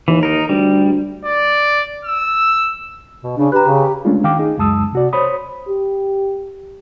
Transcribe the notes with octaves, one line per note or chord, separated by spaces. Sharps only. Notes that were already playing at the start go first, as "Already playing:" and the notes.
D#2 E3
D#4 A#4
D2 G3
D5
E6
B2
C#3 D4
G4 B4 A#5 F#6
C#3 A#5
G#3 A3 C#4 D4 F4
D#3 F5 G5 D6
D#4 G#4
C#2 F#2 G#3 A5 D#6 E6
C3 F#4 D5
C5 C#5 B5 D#6
G4